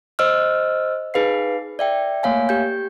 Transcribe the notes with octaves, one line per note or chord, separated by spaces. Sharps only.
C5 D#5 E6 F6
D#4 G#4 B4 F5 C7
D5 E5 G5
A3 A#3 C#5 F5 G#5
G4 G6